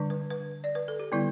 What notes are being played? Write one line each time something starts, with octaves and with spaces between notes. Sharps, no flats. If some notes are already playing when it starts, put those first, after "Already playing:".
Already playing: D3 G3 D4
B4
B4
D5
B4
A4
G4
D3 G3 B3 E4